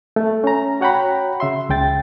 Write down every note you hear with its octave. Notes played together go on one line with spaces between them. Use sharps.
A3
C#4 A#5
F#4 C#5 F#5 G5 A#5 B5
C#3 E5 C6
C#2 C#3 G5 A6